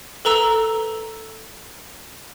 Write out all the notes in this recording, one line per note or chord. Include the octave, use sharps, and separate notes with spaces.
A4 B4 A#5 E6 G7